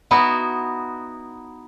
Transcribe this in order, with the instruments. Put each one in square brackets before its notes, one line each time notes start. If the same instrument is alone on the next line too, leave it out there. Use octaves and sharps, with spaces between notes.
[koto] B3 D#4 E4 F#4